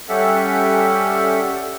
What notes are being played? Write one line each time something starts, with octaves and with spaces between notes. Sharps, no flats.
G3 C#4 G4 A4 E5 F#5